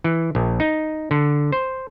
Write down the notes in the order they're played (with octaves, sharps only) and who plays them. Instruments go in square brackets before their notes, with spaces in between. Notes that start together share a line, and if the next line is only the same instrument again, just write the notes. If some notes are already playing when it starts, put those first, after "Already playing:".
[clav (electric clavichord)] E3
A#1
D#4
D3
C5